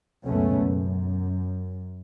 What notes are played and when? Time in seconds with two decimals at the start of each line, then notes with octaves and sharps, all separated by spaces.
0.24 C#2 F#2 B2 A3 B3 C#4
0.59 F#2